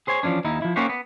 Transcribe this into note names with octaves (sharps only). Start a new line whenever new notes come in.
G#4 C5 C#5 G#5
E3 F3 G#3 C#4 D4
D#2 D#4 E4
F3 E4
A#3 C#4 D#4 F#4 G4 C5
B3